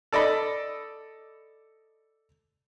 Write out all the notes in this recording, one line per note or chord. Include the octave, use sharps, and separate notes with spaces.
A4 D5 D#5 B5